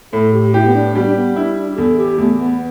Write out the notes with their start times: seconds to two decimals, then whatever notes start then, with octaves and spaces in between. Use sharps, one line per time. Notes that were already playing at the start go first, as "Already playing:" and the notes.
0.12 A2 A4
0.33 G4
0.54 E4 G4
0.66 B3
0.74 D4
0.95 G3 B3
1.06 D4
1.15 B3
1.36 D4 E4
1.57 D4
1.70 G4
1.77 E2 A4
1.98 G4
2.18 E2 A3
2.39 B3